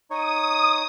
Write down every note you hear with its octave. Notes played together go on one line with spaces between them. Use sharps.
D#4 C#5 D#6